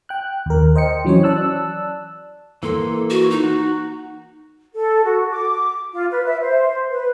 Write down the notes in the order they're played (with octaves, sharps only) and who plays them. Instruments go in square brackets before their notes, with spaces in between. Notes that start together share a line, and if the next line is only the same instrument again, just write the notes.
[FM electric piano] G5 F#6
D#2 A#4
C5 D#5 G5 C#7
E3 F#3 C#4 C5 C#5
D5 A5 E6 F#6
[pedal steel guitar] E3 A#3 C6 [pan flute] A4
[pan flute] F#4
D#4
[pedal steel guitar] F#4
[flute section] A4
F#4
D6
F4
B4
E5
C5
B4